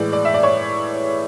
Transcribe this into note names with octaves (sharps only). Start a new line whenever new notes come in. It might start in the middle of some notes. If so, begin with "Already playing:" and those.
Already playing: A2 E3 G#3 D5
D5
E5
D5
C#5